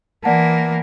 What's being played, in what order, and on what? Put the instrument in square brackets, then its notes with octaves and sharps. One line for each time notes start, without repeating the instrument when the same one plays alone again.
[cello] E3 A#3 [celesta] D5 F#5 A5